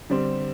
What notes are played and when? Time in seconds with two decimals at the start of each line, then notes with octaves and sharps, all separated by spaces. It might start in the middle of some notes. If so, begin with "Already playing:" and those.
0.09 D3 G3 C4 G4